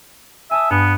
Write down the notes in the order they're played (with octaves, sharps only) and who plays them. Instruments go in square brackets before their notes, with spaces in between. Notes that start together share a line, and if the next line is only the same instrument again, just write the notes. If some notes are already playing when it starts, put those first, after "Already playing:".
[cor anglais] E5 [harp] G#5 A5 D#6
[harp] G2 [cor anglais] B3